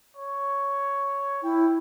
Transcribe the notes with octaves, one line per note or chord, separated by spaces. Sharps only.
C#5
E4 G5